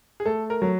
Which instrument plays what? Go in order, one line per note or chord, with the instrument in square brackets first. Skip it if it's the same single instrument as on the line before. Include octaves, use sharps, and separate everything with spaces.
[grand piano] G#4
[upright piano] A3 [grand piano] A4
[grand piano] A#4
[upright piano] F#3